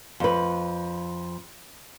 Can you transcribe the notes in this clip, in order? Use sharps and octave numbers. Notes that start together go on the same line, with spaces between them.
F2 B4